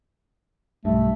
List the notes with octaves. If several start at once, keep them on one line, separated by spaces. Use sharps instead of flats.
B1 G2 A3